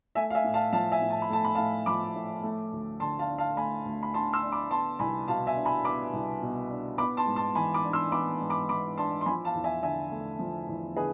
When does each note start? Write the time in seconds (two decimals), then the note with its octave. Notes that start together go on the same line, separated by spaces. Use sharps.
0.15 A3 E5 G#5
0.30 F5
0.35 E5 G#5
0.44 A2
0.54 F5 A5
0.72 F3 F5 A5
0.92 E5 G#5
1.01 A2
1.10 A5
1.22 B5
1.30 A3 A5
1.44 B5
1.55 A2 F5 A5
1.86 F3 B5 D6
2.15 A2
2.43 A3
2.72 D2
3.00 D3 A5 C6
3.19 F5 A5
3.28 D4
3.38 F5 A5
3.57 A3 G#5 B5
3.85 D2
4.03 B5
4.14 D3 A5 C6
4.33 C6 E6
4.42 D4
4.52 B5 D6
4.71 B3 A5 C6
4.99 C2 G#5 B5
5.28 B2 F5 A5
5.47 E5 G#5
5.56 D4
5.65 G#5 B5
5.85 B3 B5 D6
6.13 C2
6.42 B2
6.70 D4
6.98 B3 B5 D6
7.17 A5 C6
7.27 G#2
7.36 A5 C6
7.55 E3 G#5 B5
7.74 B5 D6
7.84 D4
7.93 C6 E6
8.12 B3 B5 D6
8.41 G#2
8.50 B5 D6
8.69 E3 B5 D6
8.97 D4 A5 C6
9.21 C6
9.26 F3 G#5 B5
9.44 F5 A5
9.54 E2
9.64 E5 G#5
9.83 D3 E5 G#5
10.11 A3
10.39 F3
10.68 E2
10.96 D3 G#4 B4